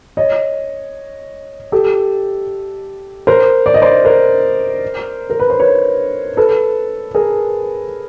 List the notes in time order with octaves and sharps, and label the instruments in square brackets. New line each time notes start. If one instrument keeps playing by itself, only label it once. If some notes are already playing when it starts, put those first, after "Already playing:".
[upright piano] C#5 D#5
G4 A4
A#4 C5
D5
D#5
C5 D5
A#4 C5
A#4
B4
C5
B4 C#5
A4 B4
G#4 A#4